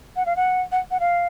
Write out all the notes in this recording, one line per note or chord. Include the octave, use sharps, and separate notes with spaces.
F#5
F5
F#5
F#5
F#5
F5